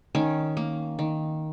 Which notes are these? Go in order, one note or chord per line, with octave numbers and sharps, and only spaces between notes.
D#3 C#4
A#3
D#3